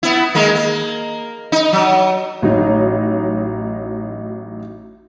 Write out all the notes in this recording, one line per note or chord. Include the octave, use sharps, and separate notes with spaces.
B3 E4
D#3 G#3 A#3
A#3
D#4
F#3
A1 F#3 D#4